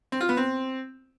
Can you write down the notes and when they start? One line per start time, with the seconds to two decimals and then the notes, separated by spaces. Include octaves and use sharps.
0.12 C4
0.21 F4
0.29 B3
0.37 C4